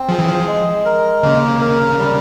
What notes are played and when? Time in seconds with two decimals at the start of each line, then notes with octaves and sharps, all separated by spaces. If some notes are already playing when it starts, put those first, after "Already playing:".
Already playing: C4
0.09 F3 G#4
0.19 E3
0.29 F3
0.47 G#3
0.85 A#4
1.23 C#3 A#3
1.61 A#4
1.99 G3